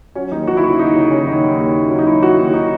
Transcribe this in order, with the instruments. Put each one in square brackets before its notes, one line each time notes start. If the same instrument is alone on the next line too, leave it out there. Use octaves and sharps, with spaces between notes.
[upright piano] F#3 C#4
D#2 D#4
D#2 F#4
E4
C#3 F#4
D#2 D#4
C#3
D#2 C#4
D#2 D#4
D#2
D#2
C#3
F#3
D#4
D#2 E4
F#3 F#4
D#2
D#4